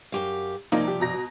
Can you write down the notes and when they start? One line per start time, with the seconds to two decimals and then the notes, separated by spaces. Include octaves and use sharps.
0.12 F#2 G4 F5
0.72 C3 F3 A#3 D#4 D5
0.88 G4
1.00 B2 A#5 A#6